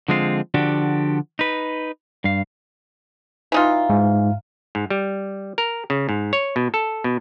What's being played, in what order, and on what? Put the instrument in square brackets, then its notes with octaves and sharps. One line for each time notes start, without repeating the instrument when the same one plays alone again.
[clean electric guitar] D3 F3 G#3 C4 F4
D3 F3 D4 F#4 G4
D#4 B4
G2 F5
[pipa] E3 D#4 F4
[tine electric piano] G#2
[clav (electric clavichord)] G#2
G3
A#4
C#3
G#2
C#5
B2
A4
B2